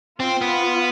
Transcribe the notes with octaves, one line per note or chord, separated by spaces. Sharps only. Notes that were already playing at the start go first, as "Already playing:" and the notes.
C4 F4
B3